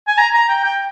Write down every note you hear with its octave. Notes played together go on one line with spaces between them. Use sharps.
G#5
A#5
A#5
G5
G5